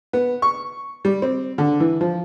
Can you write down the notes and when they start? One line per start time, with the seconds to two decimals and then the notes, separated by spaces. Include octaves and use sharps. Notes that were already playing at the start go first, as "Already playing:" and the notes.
0.13 B3
0.42 C#6
1.05 G3
1.22 C4
1.58 D3
1.80 E3
2.01 F3